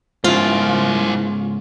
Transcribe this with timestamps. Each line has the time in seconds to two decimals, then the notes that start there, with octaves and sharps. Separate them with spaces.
0.24 G#2 C#3 E4 F4 C5